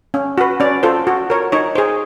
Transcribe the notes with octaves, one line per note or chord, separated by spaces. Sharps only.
C#4
F#4 B4
C#4 D5
F4 A4 C5
F#4
A#4 C#5
D#4 C#5
G#4 C5